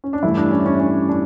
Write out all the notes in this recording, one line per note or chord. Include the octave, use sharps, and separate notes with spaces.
C#4
D4
G2 E3 A3 E4
D4
C#4
C#4
C#4
D4